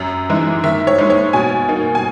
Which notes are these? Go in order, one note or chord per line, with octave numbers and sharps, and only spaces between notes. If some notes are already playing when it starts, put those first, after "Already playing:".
Already playing: F#2
E3 G#3 D#4
D#3 E5
C#5
G#3 D#4
C#5
B2 G#5
A#3 D#4
G#5